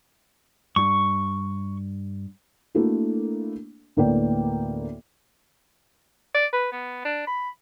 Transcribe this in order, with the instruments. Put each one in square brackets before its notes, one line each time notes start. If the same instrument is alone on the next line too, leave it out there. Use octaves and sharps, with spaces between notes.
[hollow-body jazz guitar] G2 [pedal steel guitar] C#6
[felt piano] A3 A#3 D4 E4 F#4 A4
D2 A2 A#3 B3 D5 G5
[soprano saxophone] D5
B4
B3
D4
B5